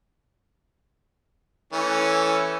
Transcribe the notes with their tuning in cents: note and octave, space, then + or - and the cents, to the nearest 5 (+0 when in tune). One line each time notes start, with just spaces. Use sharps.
E3 +0 A3 +0 C#4 +0